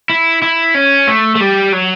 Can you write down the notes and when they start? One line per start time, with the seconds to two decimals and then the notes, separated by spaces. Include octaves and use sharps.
0.10 E4
0.42 E4
0.75 C#4
1.07 A3
1.36 A3
1.40 G3
1.72 F#3